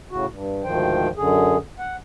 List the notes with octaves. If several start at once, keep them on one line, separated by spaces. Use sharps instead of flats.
A2 C#3 F#4
G2
D2 G#2 D#3 F3 C5 G5
F#2 D3 G#4
F#5